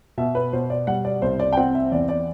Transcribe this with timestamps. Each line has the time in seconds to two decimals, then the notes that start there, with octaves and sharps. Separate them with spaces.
0.18 B2 E5
0.35 B4
0.53 B2 C5
0.70 D5
0.87 G3 F#5
1.05 D5
1.22 C2 C5
1.40 D5
1.53 G5
1.57 C4 F#5
1.75 E5
1.92 E2 D5
2.09 D5